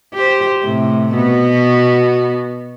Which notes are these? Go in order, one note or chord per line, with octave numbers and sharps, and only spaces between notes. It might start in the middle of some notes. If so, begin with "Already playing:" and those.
G4 C5
A2 C3
B2 B3 F#4